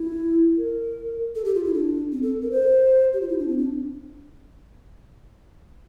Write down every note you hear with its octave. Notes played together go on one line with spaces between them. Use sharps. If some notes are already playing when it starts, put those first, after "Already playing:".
Already playing: E4
A#4
A4
G4
F4
E4
D4
C4
A4
A#4
C5
G4
F4
E4
D4
C4
D4